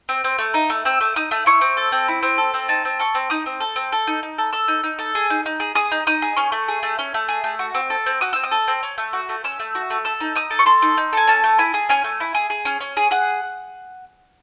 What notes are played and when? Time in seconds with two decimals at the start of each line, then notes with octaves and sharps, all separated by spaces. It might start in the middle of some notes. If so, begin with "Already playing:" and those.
0.09 C4
0.24 C4
0.38 A3
0.54 D#4
0.70 A3
0.85 C4 E6
1.01 A3
1.16 D#4 D#6
1.31 A3
1.46 E4 C#6
1.61 C4
1.77 A4
1.92 C4
2.08 E4
2.23 C4
2.38 A4
2.54 C4
2.68 D#4 A5
2.85 C4
2.99 A4 C#6
3.15 C4
3.30 D#4 D#6
3.46 C4
3.60 A4
3.76 C4
3.92 A4
4.07 D#4
4.23 D#4
4.38 A4
4.53 A4 E6
4.68 D#4
4.84 D#4
4.99 A4
5.15 G#4
5.30 D#4
5.46 D#4
5.60 G#4
5.75 G#4 D#6
5.92 D#4
6.07 D#4 D#6
6.22 G#4
6.36 C#4 C#6
6.52 A3
6.68 G#4
6.83 A3
6.99 C#4
7.14 A3
7.28 G#4
7.44 A3
7.59 F#4
7.74 C4
7.90 A4
8.06 C4
8.21 F#4 D#6
8.33 C4 E6
8.44 D#6
8.51 A4
8.68 C4
8.83 C#4
8.98 A3
9.13 F#4
9.29 A3
9.44 C#4 E6
9.60 A3
9.75 F#4
9.90 A3
10.05 A4 E6
10.20 D#4
10.35 D#4 D#6
10.51 A4
10.59 C#6
10.66 A4 C6
10.82 D#4
10.97 D#4
11.13 A4 G#5
11.27 C#4 A5
11.44 A3
11.58 E4 G#5
11.74 G#4
11.89 C#4 G#5
12.04 A3
12.20 E4
12.35 G#4
12.50 G#4
12.65 C#4
12.80 C#4
12.97 G#4
13.11 G#4 F#5